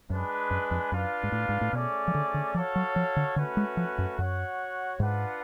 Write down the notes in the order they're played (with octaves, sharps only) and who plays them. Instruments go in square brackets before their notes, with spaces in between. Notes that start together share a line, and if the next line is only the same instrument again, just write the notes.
[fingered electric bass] F#2 [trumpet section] G#3 D4 G#4 B4
[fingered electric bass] F#2
F2
[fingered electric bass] F#2 [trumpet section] D4 F4 B4 F5
[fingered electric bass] G#2
A2
G#2
A2
[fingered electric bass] B2 [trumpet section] A3 C#4 G#4 D5
[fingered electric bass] F3
D3
D3
[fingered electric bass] F3 [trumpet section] F#4 A4 C#5 F5
[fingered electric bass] F#3
F3
D3
[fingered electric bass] D3 [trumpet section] A3 C#4 F#4 B4
[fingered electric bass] G#3
F3
F#2
[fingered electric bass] F#2 [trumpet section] F#4 C#5 F#5
[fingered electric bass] G#2 [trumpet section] D4 F4 B4 F#5